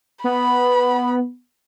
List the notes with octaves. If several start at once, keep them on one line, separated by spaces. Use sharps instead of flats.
B3 B5